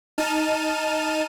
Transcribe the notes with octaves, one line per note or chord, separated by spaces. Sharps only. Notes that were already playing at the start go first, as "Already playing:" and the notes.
D#4 A5 F6 D#7